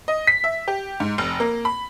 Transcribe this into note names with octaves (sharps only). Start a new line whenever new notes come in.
D#5
B6
E5
G4
G#2
F1
A#3
B5